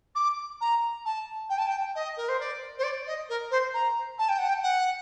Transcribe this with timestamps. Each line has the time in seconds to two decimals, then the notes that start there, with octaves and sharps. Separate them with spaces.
0.15 D6
0.61 A#5
1.05 A5
1.49 G5
1.58 A5
1.67 G5
1.95 D#5
2.16 A#4
2.28 C5
2.39 D5
2.78 C5
2.83 D5
3.07 D#5
3.29 A#4
3.50 C5
3.74 A#5
4.18 A5
4.28 G5
4.38 F#5
4.48 G5
4.62 F#5